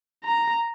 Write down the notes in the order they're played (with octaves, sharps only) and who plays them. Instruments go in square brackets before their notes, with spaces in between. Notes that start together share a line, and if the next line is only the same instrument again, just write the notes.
[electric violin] A#5